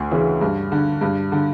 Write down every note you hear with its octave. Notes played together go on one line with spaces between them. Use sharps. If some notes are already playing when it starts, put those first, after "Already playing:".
Already playing: D2
C#3 E3
G2
D3
G2
D3